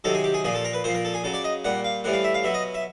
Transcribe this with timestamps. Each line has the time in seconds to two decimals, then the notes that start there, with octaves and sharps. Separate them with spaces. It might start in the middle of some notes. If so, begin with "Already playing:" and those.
0.04 C3 D#3 F#3 A4
0.14 G#4
0.24 G4
0.34 G#4
0.44 A#2 F3 G#4
0.55 A4
0.65 A#4
0.73 B4
0.84 A#2 F3 C5
0.94 A#4
1.05 A4
1.14 G#4
1.24 C#3 F#3 A4
1.34 D5
1.44 D#5
1.64 A#2 G3 F#5
1.84 F5
2.04 A2 E3 G3 F#5
2.14 F5
2.24 E5
2.34 F5
2.44 B2 F#3 E5
2.54 D#5
2.74 E5